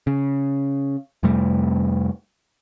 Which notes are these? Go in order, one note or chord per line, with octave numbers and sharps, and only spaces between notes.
C#3
F2 C3 G3 A3